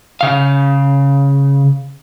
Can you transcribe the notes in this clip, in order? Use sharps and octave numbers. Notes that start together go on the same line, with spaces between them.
C#3 F5